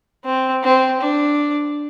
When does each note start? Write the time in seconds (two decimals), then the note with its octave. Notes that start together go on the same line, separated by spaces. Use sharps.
0.25 C4
0.63 C4
1.00 D4